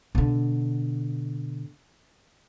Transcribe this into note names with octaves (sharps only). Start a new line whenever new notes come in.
B2 D3